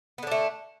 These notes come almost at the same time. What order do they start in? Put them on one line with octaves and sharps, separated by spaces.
B3 D3 D4 A3